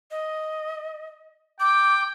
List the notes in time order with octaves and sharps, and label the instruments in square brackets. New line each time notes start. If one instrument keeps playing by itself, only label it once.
[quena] D#5
[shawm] G5 [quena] D6